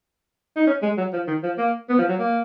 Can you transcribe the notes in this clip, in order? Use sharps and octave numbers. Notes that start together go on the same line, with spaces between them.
D#4
C#4
G#3
F#3
F3
D#3
F3
A#3
B3
F3
F#3
A#3